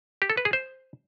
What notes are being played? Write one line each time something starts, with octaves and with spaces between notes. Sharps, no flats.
G4
A4
B4
G#4
C5